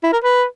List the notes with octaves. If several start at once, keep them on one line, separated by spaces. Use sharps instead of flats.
E4
A#4
B4